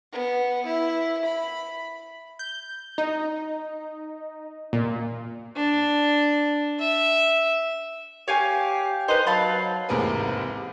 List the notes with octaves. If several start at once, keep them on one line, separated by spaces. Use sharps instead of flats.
B3
E4
B5
G6
D#4
A#2
D4
E5
G4 C#5 F5 G#5
D#4 B4 C5
F#3 F5 A5 B5
A1 G#2 C3 A#3 G#4 B4